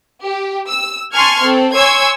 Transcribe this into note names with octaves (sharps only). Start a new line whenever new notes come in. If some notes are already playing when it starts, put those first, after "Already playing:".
G4
E6
G#5 A5 C6 C#6 F6 G#6
C4 A4
C#5 G#5 C6 C#6 E6 G#6